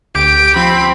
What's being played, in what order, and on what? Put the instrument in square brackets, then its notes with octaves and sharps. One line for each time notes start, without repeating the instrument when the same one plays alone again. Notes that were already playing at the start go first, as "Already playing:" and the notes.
[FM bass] D2 [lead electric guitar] G4 [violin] D7
[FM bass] F3 [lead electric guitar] C4 [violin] B5